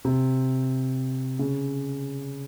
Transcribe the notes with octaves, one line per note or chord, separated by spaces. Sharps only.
C3
C#3